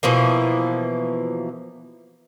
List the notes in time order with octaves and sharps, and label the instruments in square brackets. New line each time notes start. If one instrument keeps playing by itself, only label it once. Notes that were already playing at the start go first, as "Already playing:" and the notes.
[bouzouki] B2 E3 F3 A#3